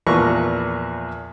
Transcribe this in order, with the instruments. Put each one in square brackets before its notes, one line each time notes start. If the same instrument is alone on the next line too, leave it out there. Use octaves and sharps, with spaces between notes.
[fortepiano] E2 A#2 F3 A#4 B4 C#6